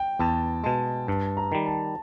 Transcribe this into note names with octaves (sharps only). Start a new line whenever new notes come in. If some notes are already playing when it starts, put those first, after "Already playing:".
Already playing: G5
E2 A5
B2 G#3 A5
G2 A5
A#5
D#3 G3
A5